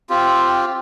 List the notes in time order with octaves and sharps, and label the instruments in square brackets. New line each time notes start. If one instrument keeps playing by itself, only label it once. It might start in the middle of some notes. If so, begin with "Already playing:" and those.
[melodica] C4 F4 G4